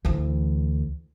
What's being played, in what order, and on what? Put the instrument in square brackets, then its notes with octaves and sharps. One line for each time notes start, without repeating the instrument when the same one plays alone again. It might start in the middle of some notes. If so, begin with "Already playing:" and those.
[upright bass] D2 E3